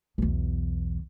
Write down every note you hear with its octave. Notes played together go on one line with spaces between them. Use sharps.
B1 E2